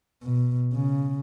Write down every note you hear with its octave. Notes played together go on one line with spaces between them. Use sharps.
B2
C#3